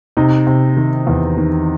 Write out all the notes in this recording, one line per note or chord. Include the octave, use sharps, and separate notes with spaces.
C3 D#4
C3
D#3
E2
D#3